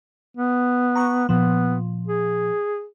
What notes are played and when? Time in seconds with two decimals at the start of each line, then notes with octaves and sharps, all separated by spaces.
0.37 B3
0.96 A#5 C#6 F#6
1.29 A#2 F3 B3
2.07 G#4